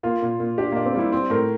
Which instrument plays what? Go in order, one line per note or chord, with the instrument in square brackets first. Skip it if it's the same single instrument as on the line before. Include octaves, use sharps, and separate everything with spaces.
[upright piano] A#3 [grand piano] F4
[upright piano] A#2
A#2
[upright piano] D4 [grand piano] G4
[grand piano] A#3 [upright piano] D4
[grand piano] C4
[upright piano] G3 [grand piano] E4
[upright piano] C4
[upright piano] A2 [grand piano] A#4